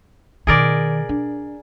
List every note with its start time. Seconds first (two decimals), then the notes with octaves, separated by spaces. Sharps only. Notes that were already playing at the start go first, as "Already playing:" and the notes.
0.47 B2 D#3 G#4 A#4 D5
1.09 D4